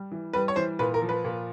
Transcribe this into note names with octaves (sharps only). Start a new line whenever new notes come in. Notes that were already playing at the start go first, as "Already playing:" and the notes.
Already playing: G3
E3
G3 B4
C#5
E3 C5
A#2 B4
A#4
F3
B4
A#2